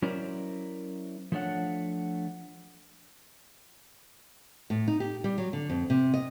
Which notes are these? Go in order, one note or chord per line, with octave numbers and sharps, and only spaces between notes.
F#3 C#4 E4 A#4 C5 D5
F3 A3 D4 C#5 F#5
A2
D#4
G4
G3
F#3
D3
F2
C3
D#5